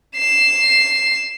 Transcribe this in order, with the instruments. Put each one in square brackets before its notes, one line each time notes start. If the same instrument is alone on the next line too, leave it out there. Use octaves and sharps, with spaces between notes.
[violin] C7 E7